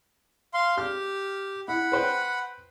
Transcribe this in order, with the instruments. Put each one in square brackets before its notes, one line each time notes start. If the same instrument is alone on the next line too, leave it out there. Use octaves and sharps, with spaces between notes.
[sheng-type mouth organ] F5 C6
[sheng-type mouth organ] G4 [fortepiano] F6
[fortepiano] E4 [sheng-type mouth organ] F#5 B5
[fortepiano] B4 C5 G5